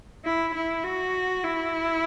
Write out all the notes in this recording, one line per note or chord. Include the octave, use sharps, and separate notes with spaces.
E4
E4
F#4
E4